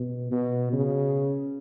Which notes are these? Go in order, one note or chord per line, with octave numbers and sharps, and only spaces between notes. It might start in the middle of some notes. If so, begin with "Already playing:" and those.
Already playing: B2
B2
C#3